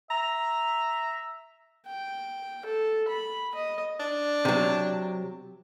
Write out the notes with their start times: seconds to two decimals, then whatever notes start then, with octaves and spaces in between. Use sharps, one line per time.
0.11 E5 A#5
1.87 G5
2.66 A4
3.09 B5
3.55 D#5
4.00 D4
4.45 C3 F#3